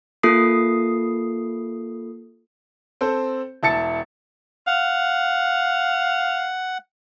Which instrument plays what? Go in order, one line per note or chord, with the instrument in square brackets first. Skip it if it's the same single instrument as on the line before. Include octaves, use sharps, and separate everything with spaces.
[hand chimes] A#3 F4 A4 D#6 C7
[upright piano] C4 A4 C5
E1 E4 A5 A6 C#7
[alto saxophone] F5 [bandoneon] F#5